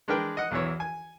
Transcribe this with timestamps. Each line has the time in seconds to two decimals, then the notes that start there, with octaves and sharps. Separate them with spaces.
0.08 G#3 D4 A#4 B4 G5
0.37 D#5 F#5
0.51 B1 E2 E3 C#5
0.80 G#5